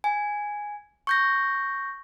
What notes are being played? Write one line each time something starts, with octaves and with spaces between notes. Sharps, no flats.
G#5
C#6 G6 A#6